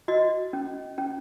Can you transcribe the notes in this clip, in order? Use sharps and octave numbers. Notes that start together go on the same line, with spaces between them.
F#4 D#5
C#4
C#4